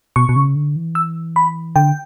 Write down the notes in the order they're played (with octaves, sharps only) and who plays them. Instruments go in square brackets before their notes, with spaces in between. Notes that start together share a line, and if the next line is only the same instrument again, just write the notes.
[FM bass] B2 [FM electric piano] C#6
[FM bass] B2
C#3
D3
E3
[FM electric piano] E6
B5
[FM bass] D3 [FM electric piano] G5